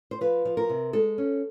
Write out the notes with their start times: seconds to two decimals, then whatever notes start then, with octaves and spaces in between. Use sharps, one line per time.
0.11 C5
0.21 F3 B4
0.45 F3
0.57 A#4
0.70 C3
0.93 G#3 A4
1.18 C#4